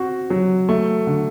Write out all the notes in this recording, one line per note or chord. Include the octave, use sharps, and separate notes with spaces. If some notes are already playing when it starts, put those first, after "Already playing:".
Already playing: C4 F#4
F#3
A3
D3